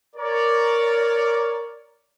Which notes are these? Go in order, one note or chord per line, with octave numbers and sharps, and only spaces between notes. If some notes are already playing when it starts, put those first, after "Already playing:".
A#4 C#5 D5